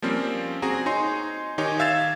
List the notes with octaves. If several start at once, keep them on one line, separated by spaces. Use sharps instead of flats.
F3 G3 A#3 C4 C#4
C4 F#4 G#4 A#5
D#4 C#5 G#5 C6
D#3 D#4 G4 C#5 G#5
E5 F5 E6 G#6 A6 E7